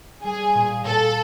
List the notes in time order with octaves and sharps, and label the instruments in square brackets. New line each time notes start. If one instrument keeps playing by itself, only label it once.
[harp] G3 [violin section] G#4
[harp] A#2
[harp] A#2 [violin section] A4